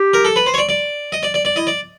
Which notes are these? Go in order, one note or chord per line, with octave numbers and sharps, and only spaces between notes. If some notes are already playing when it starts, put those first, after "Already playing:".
Already playing: G4
A#4
A4
B4
C5
C#5
D5
D5
D#5
D5
D5
D5
E4 D#5
D5